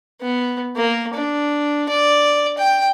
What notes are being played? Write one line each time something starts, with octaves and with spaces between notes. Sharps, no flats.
B3
A#3
D4
D5
G5